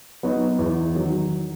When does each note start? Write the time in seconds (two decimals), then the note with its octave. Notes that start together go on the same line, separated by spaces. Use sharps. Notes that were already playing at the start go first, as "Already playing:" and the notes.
0.23 F#3 B3 D#4 F#4
0.59 E2
0.95 D#3 F#3